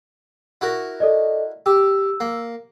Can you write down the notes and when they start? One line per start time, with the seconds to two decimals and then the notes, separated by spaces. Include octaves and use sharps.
0.61 E4 F#4 A#4
1.00 A4 D5 D#5
1.66 G4 E6
2.20 A#3